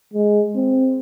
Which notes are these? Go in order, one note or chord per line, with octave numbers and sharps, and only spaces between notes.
G#3
C4